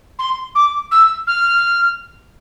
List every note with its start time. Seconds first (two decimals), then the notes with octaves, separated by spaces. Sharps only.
0.18 C6
0.55 D6
0.91 E6
1.27 F6